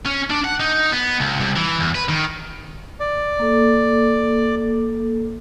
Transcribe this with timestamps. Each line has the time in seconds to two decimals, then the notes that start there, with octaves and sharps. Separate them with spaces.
0.06 C#4
0.30 D4
0.44 F#5
0.60 D#4
0.92 B3
1.20 C#2
1.40 C2
1.56 E3
1.80 E2
1.95 B4
2.09 D#3
3.00 D5
3.40 A#3 A4